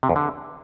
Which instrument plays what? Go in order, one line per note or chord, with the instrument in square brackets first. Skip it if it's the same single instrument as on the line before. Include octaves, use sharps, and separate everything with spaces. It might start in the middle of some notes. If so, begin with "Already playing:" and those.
[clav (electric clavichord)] C3
E2
D3